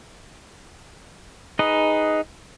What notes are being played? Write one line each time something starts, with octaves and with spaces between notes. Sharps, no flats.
D#4 G#4 B4 D#5